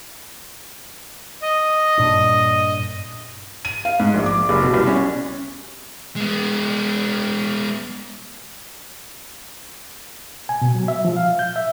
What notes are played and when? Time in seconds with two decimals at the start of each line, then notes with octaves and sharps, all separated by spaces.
1.42 D#5
1.98 G2 A#2 D4
3.65 D#7
3.85 F5
4.00 G#2
4.14 A#1
4.26 D6
4.49 F#1
4.62 B2
4.74 C2
4.87 C#4
6.16 G#3 B3
10.49 G#5
10.62 B2
10.75 F#3
10.88 E5
11.05 F3
11.17 F5
11.39 G6
11.56 E5